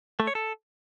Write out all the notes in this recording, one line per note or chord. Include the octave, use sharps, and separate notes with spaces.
A3
C#5
A4